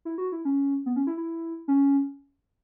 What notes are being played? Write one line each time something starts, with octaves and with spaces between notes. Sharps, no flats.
E4
F#4
E4
C#4
B3
C#4
E4
E4
C#4